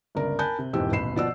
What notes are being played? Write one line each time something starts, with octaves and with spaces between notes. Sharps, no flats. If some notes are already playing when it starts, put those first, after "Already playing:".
G1 C#2 A#4 D5
A#4 G#5 A5 B5 F#6 G6
C3
E1 F2 G#2 E3 G4 E6
D#1 A1 B2 B5 C7 E7
B2 F3 D5 F#5 E6